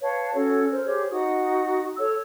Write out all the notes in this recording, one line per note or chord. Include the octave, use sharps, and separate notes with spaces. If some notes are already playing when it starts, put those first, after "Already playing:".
B4 C#5 F5 A5
C#4 F#4 A4 C#5
A#4 C5
G4 G#4 C5 C#5
D#4 F#4 D#6
A4 C#5 E6